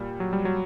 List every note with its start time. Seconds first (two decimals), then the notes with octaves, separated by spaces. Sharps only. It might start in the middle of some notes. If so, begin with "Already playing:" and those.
Already playing: A#2 G3
0.20 F#3
0.33 G3
0.45 F#3